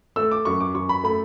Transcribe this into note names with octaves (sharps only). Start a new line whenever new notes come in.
A3 E6
D6
F#2 C#6
D6
F#2 C#6
B5
A3 B5